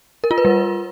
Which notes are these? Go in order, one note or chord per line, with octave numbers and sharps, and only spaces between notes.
A#4
F4
B4
G3